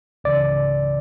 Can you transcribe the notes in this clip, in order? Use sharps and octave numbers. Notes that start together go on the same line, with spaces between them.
C#2 C#3 E3 D5